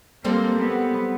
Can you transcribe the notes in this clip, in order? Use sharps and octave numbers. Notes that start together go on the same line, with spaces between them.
G3 A#3 C4 A4
B3